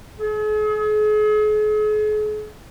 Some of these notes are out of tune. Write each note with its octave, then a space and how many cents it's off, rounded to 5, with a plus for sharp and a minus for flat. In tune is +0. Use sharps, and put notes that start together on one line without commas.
G#4 +40